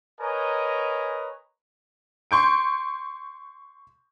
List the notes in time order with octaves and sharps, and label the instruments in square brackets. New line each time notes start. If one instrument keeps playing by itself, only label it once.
[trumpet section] A#4 B4 C#5 D#5 G#5 A#5
[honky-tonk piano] C6 C#6 G6 D7